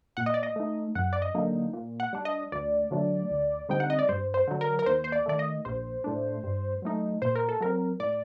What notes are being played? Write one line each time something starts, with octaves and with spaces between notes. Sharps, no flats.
A#2 F#5
D#5
D5
D#5
A3 D#4
F#2 F#5
D5
D#5
D3 F#3 A#3 D#4
A#2
F#5
G3 D4
D#5
D2 D5
D3 F#3 A3 D4
D2
D3 G3 C4 D#4 G5
F#5
D#5
D5
G2 C5
C5
D3 F#3
A#4
A#4
D#2 C5
C5
D5
D#3 A3 D5
D#5
A#1 C5
A2 A3 D4
G2
F#3 A3 D#4
A#2 C5
A#4
A4
F#3 C4 A#4
A2 D5